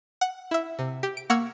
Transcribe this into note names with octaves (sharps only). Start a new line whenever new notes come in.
F#5
E4 E5
C3
G4
D7
A#3 F#5 C#6 E6 F6 G#6